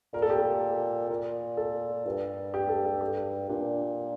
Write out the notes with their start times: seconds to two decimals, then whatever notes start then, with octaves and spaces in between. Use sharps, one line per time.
0.13 A#2 A#4
0.22 A4
0.30 G4
0.38 A4
1.10 A#2 A#4
1.57 A4
2.05 G2
2.54 G4
2.69 A4
2.85 A4
3.01 G4
3.49 A#2 D4